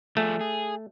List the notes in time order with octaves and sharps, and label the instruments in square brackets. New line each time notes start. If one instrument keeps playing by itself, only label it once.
[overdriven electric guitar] F3 G#4 [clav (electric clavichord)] A3
[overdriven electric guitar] G#4